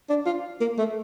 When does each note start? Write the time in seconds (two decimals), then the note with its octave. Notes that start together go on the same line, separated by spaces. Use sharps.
0.09 D4
0.26 F4
0.60 A#3
0.78 A3